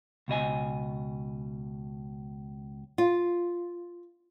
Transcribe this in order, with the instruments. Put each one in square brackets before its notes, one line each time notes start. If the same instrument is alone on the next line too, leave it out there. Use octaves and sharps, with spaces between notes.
[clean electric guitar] C#2 B2 D#5 G#5
[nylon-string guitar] F4